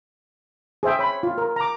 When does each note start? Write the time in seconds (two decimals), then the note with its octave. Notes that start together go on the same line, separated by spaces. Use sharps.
0.83 G#4 C5 E5 G5
0.99 C#5 B5
1.23 F4
1.38 A#4
1.56 A#5 D6